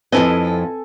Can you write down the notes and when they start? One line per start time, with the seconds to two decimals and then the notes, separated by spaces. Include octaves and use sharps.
0.12 F2 C4 E4 A4 B4 C5 D#5 G#5